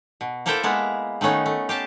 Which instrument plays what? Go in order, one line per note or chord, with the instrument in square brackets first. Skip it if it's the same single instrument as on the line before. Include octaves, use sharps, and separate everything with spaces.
[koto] B2
A#3 E4 A4 A#4 C5 G5
G#3 A#3 B3 E4
D#3 A3 B3 C#4 D#4
A3
G4 F5 A5